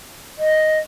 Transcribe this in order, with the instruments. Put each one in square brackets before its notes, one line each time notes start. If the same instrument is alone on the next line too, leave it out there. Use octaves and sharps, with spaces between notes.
[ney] D#5